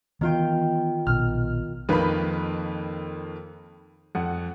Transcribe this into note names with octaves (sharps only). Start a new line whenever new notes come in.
D#3 E3 B3 F4 G5
A#1 B2 F6
F2 D#3 A#3 B4 B5
F2 F#5